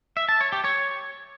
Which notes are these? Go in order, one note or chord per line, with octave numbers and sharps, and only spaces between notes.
E5
A5
C#5
G4
C#5